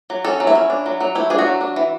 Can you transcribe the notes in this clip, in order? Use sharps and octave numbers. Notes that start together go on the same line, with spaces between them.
F#3
C#4 A4
F#3
E4
C#4
D4
F#3
F#3
A3 E4
D4 G#4
F#4
F#3
D4
E3